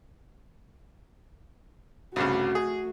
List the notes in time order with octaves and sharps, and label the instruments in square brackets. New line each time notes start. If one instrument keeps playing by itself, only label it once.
[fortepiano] C2 G2 C#3 [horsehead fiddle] A3 F#4
[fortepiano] G#4